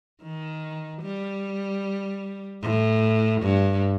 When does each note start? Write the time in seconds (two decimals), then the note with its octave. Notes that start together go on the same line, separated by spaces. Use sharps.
0.22 D#3
1.02 G3
2.62 A2
3.42 G2